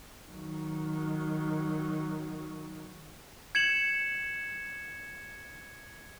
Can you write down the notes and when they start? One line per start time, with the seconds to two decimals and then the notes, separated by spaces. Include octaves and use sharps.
0.31 D#3 F#3
3.55 G#6 C#7 E7 F#7